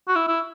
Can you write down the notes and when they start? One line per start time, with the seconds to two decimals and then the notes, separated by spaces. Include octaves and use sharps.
0.08 F#4
0.16 E4
0.28 E4